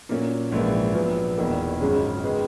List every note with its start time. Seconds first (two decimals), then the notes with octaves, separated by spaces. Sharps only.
0.09 A#2 F#3 A#3 C#4
0.52 A#1 G#2 E3 A#3
0.94 A#1 A#2 F#3 B3
1.37 E1 E2 D#3 A#3
1.80 G#1 F#2 C#3 G#3 C#4
2.23 D#3 G#3 B3